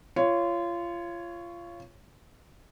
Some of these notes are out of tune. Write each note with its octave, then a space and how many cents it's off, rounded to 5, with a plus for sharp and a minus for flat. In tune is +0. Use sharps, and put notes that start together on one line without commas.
F4 -25 C#5 +0